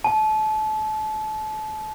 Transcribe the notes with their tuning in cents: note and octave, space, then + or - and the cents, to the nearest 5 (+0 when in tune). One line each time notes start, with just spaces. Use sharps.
A5 -30